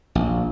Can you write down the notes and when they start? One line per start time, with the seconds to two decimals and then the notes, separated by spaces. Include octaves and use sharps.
0.15 A#1